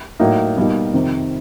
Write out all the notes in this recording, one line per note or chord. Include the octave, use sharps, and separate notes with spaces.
A2 F#3 A#3 D#4
B2 G3 A#3 D#4
F2 C3 D#3